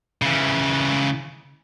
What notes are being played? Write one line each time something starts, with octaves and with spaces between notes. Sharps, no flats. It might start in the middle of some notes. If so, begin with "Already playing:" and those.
C#3 E3